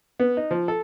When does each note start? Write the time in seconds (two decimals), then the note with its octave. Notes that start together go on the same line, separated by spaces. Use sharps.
0.20 B3
0.37 D#4
0.51 F3
0.68 A4